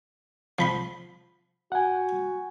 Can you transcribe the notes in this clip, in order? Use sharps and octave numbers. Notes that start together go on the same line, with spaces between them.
F3 B5 C6
F#4 F#5 G#5